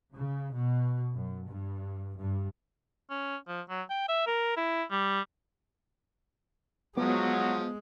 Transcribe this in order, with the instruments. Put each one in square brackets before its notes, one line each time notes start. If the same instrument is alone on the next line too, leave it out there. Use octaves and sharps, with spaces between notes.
[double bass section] C#3
B2
F#2
G2
G2
[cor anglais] C#4
F3
F#3
G5
E5
A#4
E4
G3
[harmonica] F3 D#6 [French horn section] F#3 [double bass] G#3 [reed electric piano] B3